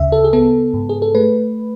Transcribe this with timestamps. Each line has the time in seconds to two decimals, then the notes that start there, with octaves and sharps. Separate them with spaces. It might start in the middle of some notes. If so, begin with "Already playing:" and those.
Already playing: D2 C#3 E5
0.12 A4
0.24 G#4
0.33 B3 A4
0.74 G#2
0.89 G#4
1.02 A4
1.15 A3 B4